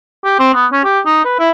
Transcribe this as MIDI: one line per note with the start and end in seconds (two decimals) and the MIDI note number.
0.25 0.37 67
0.40 0.54 60
0.54 0.66 59
0.72 0.84 61
0.84 1.00 67
1.06 1.24 63
1.25 1.37 71
1.39 1.51 64